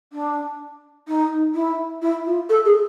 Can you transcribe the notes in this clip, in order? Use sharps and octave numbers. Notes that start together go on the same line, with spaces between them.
D4
D#4
E4
E4
F4
A4
G#4